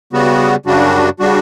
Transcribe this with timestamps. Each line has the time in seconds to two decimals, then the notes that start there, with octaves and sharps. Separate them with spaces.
0.13 C#3 G3 B3 F#4
0.66 F#2 C#3 G3 D4 F#4
1.19 C#3 G3 D4 F#4